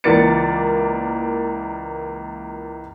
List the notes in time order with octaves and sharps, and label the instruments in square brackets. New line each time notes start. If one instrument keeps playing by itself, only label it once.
[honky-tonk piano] C#2 E3 A#3 D5 A6 C#7